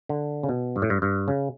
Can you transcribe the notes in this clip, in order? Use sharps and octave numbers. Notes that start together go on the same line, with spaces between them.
D3
C#3
B2
G2
A2
G2
G2
C#3